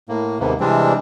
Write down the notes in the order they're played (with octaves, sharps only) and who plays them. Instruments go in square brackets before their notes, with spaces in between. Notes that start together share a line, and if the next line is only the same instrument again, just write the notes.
[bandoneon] A2 A#3
D#2 G#2 C3 A#3 B3
C3 E3 G3 G#3 C4 D4